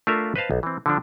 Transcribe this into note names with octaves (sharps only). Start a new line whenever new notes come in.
A3 D4 F4 A#4 E5 F5
B4 C5 D#5 F5 A5
B1
E3 C4
D3 F3 D4